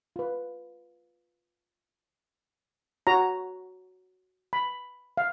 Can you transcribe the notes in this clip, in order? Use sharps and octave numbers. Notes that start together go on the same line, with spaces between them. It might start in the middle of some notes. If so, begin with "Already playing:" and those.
F4 B4
F#4 C#5 A#5
B5
F5